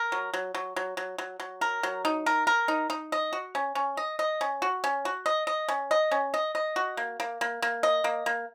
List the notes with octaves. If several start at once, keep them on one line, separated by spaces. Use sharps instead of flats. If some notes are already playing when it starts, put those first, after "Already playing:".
Already playing: A#4
F#3
F#3
F#3
F#3
F#3
F#3
F#3
A#4
F#3
D#4
A#4
A#4
D#4
D#4
D#5
F#4
C#4
C#4
D#5
D#5
C#4
F#4
C#4
F#4
D#5
D#5
C#4
D#5
C#4
D#5
D#5
F#4
A#3
A#3
A#3
A#3
D#5
A#3
A#3